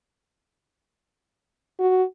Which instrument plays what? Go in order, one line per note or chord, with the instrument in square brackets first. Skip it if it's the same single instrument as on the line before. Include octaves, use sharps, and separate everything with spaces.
[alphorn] F#4